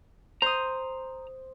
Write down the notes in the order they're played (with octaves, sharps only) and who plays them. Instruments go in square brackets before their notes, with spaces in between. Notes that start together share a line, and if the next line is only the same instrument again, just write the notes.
[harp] C5 D#6 [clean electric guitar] A#5